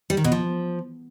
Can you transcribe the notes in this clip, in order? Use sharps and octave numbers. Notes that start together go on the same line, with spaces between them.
G3
D#3
B2
F3